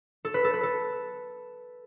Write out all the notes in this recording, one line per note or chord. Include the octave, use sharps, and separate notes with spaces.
A4
B4
A4
B4
A4